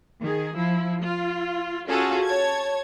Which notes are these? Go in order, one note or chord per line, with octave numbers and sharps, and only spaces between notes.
D#3 G#4
F3 E4
F4
C#4 F4 F#4 G#4 A4
C#5 A5 G#6